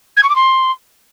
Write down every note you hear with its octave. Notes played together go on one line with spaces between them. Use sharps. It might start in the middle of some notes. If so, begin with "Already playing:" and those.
G#6
C#6
D6
C6